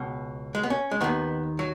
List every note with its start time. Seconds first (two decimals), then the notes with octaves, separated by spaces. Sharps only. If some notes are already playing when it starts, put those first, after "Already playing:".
Already playing: C#2 B2
0.55 G#3
0.63 B3
0.70 C#4
0.91 G#3
1.01 D#2 D#3 B3
1.59 F#3